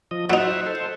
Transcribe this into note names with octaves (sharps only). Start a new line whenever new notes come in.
F3 D#5
F#3 D#4 C5 E5 F#5
A4 C5